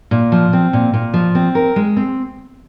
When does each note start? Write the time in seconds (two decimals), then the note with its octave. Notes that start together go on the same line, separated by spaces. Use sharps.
0.11 A#2
0.32 F3
0.53 C4
0.73 A#2
0.94 A#2
1.14 F3
1.35 C4
1.55 A#4
1.76 G#3
1.97 C4